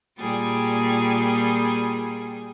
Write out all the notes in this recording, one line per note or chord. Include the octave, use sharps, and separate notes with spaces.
A#2 G3 G#4